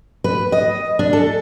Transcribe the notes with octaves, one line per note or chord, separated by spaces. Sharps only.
B4
D#5
D4
A4